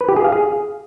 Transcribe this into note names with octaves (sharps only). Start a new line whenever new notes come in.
B4
G4
G#4
F5
G#4